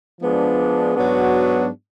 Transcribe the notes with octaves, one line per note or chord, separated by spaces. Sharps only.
F3 G#3 B3 D4
G#2 F#3 B3 D4 F#4